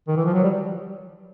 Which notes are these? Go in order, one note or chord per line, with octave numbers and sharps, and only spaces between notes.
D#3
E3
F3
F#3
G3